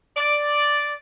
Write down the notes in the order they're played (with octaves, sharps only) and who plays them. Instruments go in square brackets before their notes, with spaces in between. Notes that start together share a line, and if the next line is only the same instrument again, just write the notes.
[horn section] D5